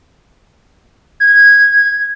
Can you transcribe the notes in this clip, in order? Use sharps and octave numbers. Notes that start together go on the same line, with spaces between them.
G#6